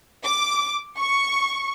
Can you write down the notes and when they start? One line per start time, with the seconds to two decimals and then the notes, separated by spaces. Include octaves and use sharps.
0.24 D6
0.98 C#6